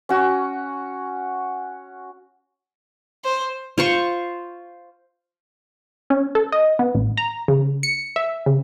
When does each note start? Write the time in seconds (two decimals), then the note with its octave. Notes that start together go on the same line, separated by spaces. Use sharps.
0.09 C#4 F#4
3.24 C5
3.78 F4 C5 C#6
6.10 C#4
6.35 A4
6.52 D#5
6.79 B3
6.95 A1
7.17 A#5
7.48 C#3
7.83 C#7
8.16 E5
8.46 C#3